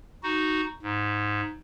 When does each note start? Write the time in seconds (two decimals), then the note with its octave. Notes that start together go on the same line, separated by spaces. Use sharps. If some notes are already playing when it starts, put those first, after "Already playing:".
0.23 D#4 F#4
0.82 G#2